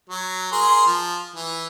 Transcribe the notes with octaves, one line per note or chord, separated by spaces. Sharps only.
F#3
G#4 A#4 C6
F3
E3